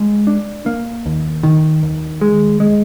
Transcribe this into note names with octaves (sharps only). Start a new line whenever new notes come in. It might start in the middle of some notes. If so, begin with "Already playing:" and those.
Already playing: G#3
D4
A#3
D#2
D#3
D#2
G#3
G#3